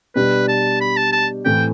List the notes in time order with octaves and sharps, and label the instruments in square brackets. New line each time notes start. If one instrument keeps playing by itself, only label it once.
[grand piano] B2 G3 D4 G4 D5 [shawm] B4
[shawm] A5
B5
A5
A5
[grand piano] A2 E3 A3 C4 [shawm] G5